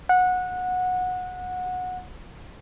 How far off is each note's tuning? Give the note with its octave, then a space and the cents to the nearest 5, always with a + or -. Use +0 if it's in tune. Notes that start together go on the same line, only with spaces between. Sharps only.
F#5 -20